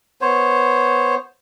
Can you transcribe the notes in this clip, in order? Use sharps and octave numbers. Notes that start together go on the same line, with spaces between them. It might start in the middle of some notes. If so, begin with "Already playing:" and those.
B3 C5 C#5